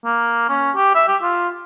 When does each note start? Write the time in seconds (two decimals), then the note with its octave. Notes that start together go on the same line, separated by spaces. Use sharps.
0.04 A#3
0.49 C#4
0.76 G4
0.95 E5
1.08 G4
1.22 F4